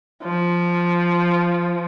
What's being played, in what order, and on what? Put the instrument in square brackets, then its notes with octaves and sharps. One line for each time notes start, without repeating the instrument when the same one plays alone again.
[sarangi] F3